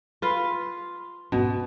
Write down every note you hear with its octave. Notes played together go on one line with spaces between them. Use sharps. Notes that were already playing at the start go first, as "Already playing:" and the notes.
F4 B4 F5
G#2 B2 B3 C#4